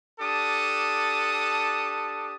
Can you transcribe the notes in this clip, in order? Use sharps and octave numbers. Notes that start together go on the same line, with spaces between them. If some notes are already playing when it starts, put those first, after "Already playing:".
D4 G4 A4 A5 D#6